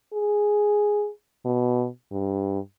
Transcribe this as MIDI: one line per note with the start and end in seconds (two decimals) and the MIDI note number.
0.13 1.09 68
1.45 1.88 47
2.12 2.59 43